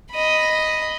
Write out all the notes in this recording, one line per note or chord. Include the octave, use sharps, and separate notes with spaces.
D#5 B5